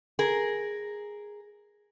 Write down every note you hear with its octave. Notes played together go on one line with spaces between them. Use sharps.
G#4 A#4